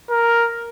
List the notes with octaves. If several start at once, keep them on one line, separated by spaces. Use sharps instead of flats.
A#4